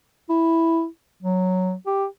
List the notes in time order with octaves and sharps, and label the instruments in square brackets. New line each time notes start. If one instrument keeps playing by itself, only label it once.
[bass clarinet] E4
F#3
G4